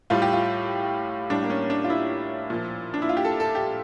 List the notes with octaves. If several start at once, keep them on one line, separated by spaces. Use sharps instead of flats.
A2 G3 F4
G4
F4
A2 G3 D4
A#3
C#4
D4
F4
E4
A#2 F3
D4
E4
F4
G4
A4
A4
G4